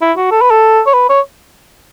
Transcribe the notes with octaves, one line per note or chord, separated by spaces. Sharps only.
E4
F#4
A4
B4
A4
C#5
B4
C#5